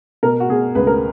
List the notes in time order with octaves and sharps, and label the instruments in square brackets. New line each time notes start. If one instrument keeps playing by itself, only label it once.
[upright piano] B2 A#4
F#4
B2 G#4
C#2 B4
A#4